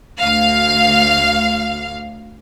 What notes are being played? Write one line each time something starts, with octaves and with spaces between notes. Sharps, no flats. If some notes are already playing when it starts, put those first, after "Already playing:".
D2 F5